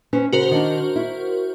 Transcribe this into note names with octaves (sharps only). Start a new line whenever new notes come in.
C#4 B4 C5
C#3 F#4 A#4 C5
D#3 D4
E4